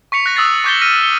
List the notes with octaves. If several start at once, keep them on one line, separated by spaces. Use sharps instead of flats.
C#6 B6 C#7 F7
C#6 F#6 A#6
D#6 E6 F#6 A6 C7
C#6 D6 G6 A6 B6 G7
F6 A#6 B6 D#7
C#7 G7